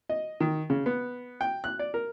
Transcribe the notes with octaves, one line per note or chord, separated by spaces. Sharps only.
D#5
D#3
C#3
B3
G5
F#6
D5
A#4